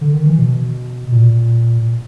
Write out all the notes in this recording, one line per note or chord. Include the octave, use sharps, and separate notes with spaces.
D3
D#3
E3
B2
A#2